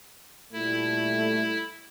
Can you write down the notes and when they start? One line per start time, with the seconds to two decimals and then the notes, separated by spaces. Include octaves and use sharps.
0.53 A#2 G3 A3 E4